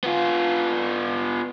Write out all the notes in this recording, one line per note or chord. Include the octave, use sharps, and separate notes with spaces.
B3 F4